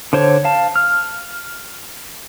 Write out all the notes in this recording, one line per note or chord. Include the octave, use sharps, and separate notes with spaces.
D3 C5 C#5
F5 A5
F6